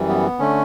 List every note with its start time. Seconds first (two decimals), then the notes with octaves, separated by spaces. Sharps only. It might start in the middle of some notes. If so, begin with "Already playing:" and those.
Already playing: F#2 E3 G3
0.09 B3
0.39 D3 A3 C#4